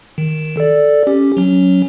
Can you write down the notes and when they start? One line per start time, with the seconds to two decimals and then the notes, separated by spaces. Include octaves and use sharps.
0.18 D#3
0.57 A4 D5
1.07 C#4 G4
1.37 F#3 C#4